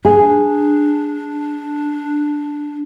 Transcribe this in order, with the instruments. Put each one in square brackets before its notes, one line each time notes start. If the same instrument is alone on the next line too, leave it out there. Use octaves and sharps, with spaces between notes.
[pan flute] D4 [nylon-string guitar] G#4